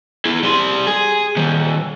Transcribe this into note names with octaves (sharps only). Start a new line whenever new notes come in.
E4 G#4
G3 C6
G#4
D#3 G3